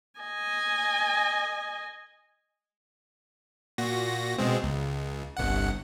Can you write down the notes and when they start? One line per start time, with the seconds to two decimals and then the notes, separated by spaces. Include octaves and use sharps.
0.20 D#5 G#5
3.78 A#2 F#4 A#6
4.38 B2 G#3 C4
4.63 C#2
5.37 G1 C2 F#5